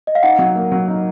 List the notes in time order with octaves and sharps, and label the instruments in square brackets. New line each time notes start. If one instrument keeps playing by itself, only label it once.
[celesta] D#5
F5
[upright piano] D#4 [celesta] F#5
[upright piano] F#3
A#3
F#3
D#4